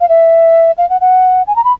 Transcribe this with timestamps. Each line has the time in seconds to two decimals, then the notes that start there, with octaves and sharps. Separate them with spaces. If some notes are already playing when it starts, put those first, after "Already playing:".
0.01 F5
0.09 E5
0.78 F5
0.90 F#5
1.01 F#5
1.47 G#5
1.56 A#5
1.64 B5